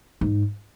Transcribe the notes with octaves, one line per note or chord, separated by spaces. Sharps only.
G#2